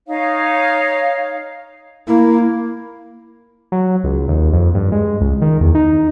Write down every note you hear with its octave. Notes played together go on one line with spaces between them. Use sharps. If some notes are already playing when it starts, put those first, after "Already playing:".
D#4 C#5 F5
A#3 E4
F#3
C#2
D#2
F2
G2
G#3
C#2
D#3
E2
D#4